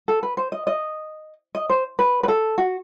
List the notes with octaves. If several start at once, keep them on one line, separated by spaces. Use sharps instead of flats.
A4
B4
C5
D#5
D#5
D#5
C5
B4
B4
A4
F#4